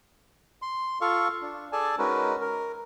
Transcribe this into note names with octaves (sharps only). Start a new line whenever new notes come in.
C6
F4 A4 F5 C#6
D4
G#4 A4 D5 G#5 A5
G#3 C#4 D#4 F#4 A#4 B4
A#4